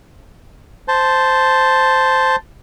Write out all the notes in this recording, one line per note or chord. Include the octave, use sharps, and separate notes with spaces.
C5 A5